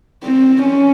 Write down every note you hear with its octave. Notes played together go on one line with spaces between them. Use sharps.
C4
C#4